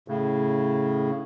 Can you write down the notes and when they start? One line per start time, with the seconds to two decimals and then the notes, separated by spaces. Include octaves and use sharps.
0.08 A2 C#3